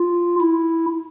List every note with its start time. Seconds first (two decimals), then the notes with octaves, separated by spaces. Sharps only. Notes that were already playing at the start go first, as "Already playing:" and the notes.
Already playing: F4
0.41 E4